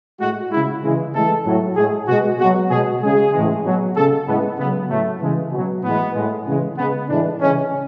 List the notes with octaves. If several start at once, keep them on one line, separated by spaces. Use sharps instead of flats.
A2 G#3 F#4
C#3 G#3 E4
C#3 E3 G#3
A2 E3 G#3 A4
A2 F#3
A2 G#3 G#4
B2 G#3 F#4
B2 F#3 F#4
B2 G#3 G#4
C#3 G#3 G#4
A2 E3 G#3
B2 F#3
C#3 G#3 A4
A2 G#3 B3
C#3 F#3 B3
A2 F#3 A3
C#3 E3 G#3
B2 F#3
A2 E3 G#3 B3
A2 G#3
C#3 E3 G#3
C#3 G#3 B3
A2 E3 G#3 D4
C#3 E3 G#3 C#4